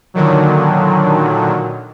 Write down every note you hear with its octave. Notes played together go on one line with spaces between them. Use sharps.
A#2 D3 D#3 F#3